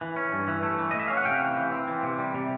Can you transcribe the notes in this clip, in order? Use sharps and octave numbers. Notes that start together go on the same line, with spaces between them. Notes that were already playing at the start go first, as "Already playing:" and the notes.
E3
C#4
G2
E3
A3
E3
D#5
A3
E5
C#4 F5
F#5
C3 F5 G5
E3
E3
C4
E3
C3
G3
C3